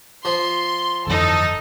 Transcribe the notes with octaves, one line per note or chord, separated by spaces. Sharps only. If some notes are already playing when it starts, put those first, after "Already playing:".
F3 C6
G1 F2 E3 D#4 A4